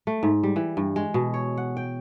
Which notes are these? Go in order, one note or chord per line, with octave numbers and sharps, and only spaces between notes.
A3
G#2
G3
E3
G2
G#3
B2
C#5
F#5
G5